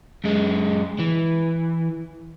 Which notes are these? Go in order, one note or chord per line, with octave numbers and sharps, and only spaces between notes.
F#2 G#3
E3